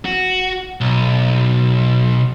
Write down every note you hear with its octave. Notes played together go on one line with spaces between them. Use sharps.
F#4
B1